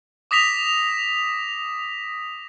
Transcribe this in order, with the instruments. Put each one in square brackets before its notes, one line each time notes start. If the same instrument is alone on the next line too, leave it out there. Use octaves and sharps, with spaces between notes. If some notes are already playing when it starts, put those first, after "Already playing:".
[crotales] D6 D#6 A#6 B6 F7